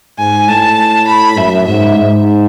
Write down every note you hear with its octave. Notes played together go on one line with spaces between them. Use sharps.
G#2 G#5
A2 A5
B5
F#2 E5
G#2 E5
G#2